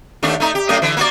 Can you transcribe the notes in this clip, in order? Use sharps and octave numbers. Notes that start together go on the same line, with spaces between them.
D#2 A3 D4
A3 D#4
G4
F#2 A3 D#5
D3 E3
A#3 F#4 D5